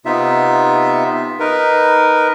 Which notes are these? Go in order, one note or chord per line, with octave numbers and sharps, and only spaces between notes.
C3 B3 D#4 F4 E5
D#4 A#4 B4